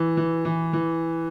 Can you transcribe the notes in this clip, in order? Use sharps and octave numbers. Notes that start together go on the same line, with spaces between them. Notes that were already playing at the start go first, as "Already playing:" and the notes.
Already playing: E3
E3
E3
E3